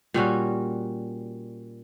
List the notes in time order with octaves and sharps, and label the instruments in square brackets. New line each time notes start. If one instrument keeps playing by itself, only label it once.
[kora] A#2 G3 C#4 F#4